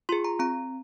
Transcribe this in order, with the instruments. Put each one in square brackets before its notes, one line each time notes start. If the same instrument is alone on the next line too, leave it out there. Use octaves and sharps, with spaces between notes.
[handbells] F4 G#4 C6
A#5
C4 A#5